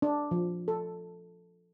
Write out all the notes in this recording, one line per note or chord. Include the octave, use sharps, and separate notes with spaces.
D4
F3
A4